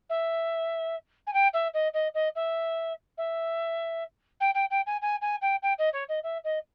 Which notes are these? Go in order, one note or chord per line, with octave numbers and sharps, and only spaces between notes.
E5
G#5
G5
E5
D#5
D#5
D#5
E5
E5
G5
G5
G5
G#5
G#5
G#5
G5
G5
D#5
C#5
D#5
E5
D#5